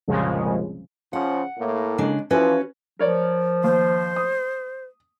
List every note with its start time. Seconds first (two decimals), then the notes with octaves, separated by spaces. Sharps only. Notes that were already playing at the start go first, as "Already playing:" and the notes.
0.08 C2 F2 A#2 C#3 F3 G#3
1.13 C#3 F3 F#5
1.58 A2 A#3
1.98 C#3 G#3 D4
2.31 E3 F3 C#4 F#4 B4
2.99 F3 A#4 C#5 D5
3.64 D#2 C5
4.16 D#6